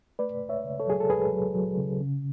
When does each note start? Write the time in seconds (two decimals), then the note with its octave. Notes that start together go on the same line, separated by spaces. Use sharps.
0.19 A3 B4 D5
0.42 D2
0.49 C#5 E5
0.65 C#3
0.80 A4 C#5
0.87 F#3 G#4
1.00 A4
1.09 D2 G#4 B4
1.33 F#3
1.55 F#3
1.78 C#3
2.00 C#3